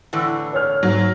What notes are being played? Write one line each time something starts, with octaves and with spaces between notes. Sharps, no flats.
A2 D3 E3
C#5 F6
G#2 F#3